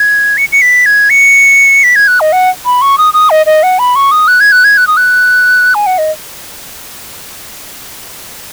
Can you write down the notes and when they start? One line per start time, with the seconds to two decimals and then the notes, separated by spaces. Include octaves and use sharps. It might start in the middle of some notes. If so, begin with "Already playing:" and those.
Already playing: G#6
0.37 C#7
0.52 C#7
0.62 B6
0.86 G#6
1.10 C#7
1.84 B6
1.96 G#6
2.08 F#6
2.20 D#5
2.32 F#5
2.66 B5
2.82 C#6
2.98 D#6
3.14 D#6
3.30 D#5
3.46 D#5
3.63 F#5
3.79 B5
3.96 C#6
4.11 D#6
4.28 F#6
4.40 G#6
4.52 F#6
4.64 G#6
4.77 F#6
4.87 D#6
4.97 F#6
5.75 G#5
5.86 F#5
5.98 D#5